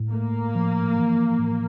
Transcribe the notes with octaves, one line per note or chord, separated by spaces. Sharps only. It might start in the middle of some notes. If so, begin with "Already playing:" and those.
Already playing: A2
A3 A#3
F3
E3
A2